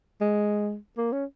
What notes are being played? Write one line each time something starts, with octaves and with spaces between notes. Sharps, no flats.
G#3
A#3
C#4